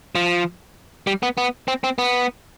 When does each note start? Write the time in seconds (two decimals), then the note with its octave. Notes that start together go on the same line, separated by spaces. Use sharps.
0.15 F3
1.07 G3
1.23 B3
1.38 B3
1.68 C4
1.84 C4
1.98 B3